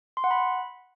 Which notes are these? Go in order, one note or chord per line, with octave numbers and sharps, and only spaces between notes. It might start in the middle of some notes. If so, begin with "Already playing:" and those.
C6
F#5
B5